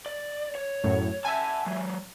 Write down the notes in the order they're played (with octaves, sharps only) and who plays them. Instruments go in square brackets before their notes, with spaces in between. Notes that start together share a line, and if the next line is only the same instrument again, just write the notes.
[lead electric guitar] D5
C#5
[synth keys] F#2 A2 F#3
[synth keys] E5 G#5 [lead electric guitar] F#5 A5
[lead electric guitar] F#3 G#3